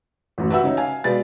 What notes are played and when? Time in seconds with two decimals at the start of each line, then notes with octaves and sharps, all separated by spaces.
0.38 A1 F#2
0.50 F#4 B4 E5 F#5 E6
0.64 C#3 D#4 C#5
0.77 F5 G#5
1.04 B2 G#3 B4 D5 A6